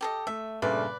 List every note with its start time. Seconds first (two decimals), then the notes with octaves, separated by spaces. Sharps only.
0.01 G4 A4 D#5
0.27 A3 E5
0.62 G2 A#2 C#3 A3 B4 D5